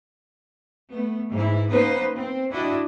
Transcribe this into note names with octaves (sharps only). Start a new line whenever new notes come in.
A3 B3
G#2 E3 E4
A#3 B3 C#4 D#4 B4 C5
C4
D4 E4 F#4 G4 D#5